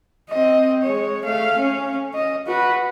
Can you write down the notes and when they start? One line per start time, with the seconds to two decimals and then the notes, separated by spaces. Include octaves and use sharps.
0.30 C4 D#5
0.83 G#3 C#5
1.24 A3 F5
1.57 C#4
2.14 D#5
2.47 F#4 B4